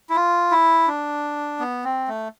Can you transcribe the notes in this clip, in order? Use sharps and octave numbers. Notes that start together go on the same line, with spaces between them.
E4
F4
E4
D4
B3
C4
A3